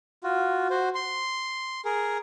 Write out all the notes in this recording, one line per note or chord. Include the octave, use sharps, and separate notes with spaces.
F4 F#4
F#4 C5
C6
G#4 A#4